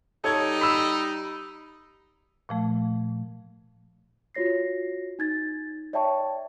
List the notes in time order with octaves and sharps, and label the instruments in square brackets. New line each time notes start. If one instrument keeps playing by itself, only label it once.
[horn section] G3 D#4 [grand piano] A4 C#5 G#6
[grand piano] B5 E6
[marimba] A#2 F3 A3
[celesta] F4 F#4 C#5 A#6 C7
D#4 G#6 A6
C#5 D5 E5 G5 A5 C#6